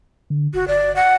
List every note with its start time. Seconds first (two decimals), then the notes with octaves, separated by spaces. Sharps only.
0.30 D3
0.54 F#1 F#4
0.68 G1 D5
0.96 F#5